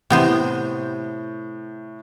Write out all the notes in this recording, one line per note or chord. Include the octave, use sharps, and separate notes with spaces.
A2 C3 B3 C5